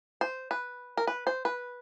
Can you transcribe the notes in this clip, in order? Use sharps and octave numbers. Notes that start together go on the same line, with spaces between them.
C5
B4
A#4
B4
C5
B4